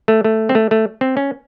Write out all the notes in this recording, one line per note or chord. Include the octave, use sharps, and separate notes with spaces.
A3
A3
C4
A3
A3
C4
C#4